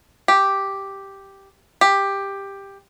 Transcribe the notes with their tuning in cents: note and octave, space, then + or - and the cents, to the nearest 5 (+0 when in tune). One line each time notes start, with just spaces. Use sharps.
G4 +0
G4 +10